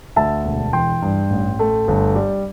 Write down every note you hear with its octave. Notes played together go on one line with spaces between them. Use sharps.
D2 E5 A5
E1
E3 G5 C6
G2
A1
A3
G1
G3